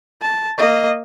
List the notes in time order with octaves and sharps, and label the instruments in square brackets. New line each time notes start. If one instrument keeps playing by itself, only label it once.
[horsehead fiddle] A5
A#3 D#5